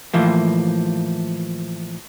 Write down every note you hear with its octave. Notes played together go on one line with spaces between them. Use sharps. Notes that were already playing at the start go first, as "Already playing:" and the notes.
A2 E3 F3 A#3